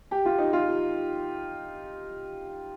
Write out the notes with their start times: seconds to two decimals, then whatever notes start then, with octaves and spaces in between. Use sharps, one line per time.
0.11 G4
0.25 F4
0.39 D#4
0.53 F4